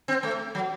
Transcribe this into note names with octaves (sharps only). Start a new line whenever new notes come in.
C4
A3
F#3